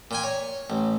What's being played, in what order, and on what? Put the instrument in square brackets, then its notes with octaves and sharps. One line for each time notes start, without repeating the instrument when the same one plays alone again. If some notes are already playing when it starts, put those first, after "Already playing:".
[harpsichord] A#2 G5 G#5
C#5
A1